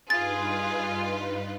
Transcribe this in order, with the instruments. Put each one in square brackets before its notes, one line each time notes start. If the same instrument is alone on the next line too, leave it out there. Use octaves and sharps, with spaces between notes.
[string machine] G2 D#4 B4 [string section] F4 [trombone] G#4 [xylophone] A6